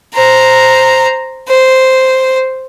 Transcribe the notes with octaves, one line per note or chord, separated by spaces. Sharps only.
C5 A#5
C5